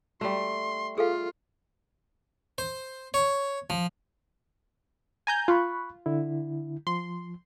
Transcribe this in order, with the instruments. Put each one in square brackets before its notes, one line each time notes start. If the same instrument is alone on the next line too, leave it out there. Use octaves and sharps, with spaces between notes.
[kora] G3 A3 [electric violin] C6
[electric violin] F4 [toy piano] G#4 A4 F5
[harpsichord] C5
C#5
F3
[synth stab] G#5 A#5 G6
[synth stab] F4 [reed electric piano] B5 C#6 F#6
[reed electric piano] D3 E4
[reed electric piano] F3 [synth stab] C6